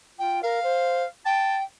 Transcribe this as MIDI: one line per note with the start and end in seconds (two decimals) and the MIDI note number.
0.19 0.41 65
0.19 0.40 79
0.43 0.62 70
0.43 1.05 77
0.64 1.04 72
1.26 1.64 79
1.26 1.57 81